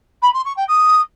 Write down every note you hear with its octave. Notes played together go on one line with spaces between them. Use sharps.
B5
C6
C#6
G5
D#6